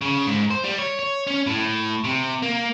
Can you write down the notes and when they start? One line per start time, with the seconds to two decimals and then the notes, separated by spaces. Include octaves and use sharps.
0.01 C#3
0.27 G#2
0.51 C5
0.64 G3
0.78 C#5
0.99 C#5
1.27 C#4
1.47 A2
2.04 C3
2.42 A#3